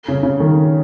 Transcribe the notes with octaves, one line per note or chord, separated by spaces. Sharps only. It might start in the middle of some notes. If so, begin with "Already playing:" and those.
C#3
C#3
D#3